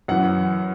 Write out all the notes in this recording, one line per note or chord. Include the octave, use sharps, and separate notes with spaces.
F#2 E3 F#5